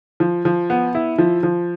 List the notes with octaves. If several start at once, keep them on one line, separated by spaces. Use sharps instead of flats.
F3
F3
B3
E4
F3
F3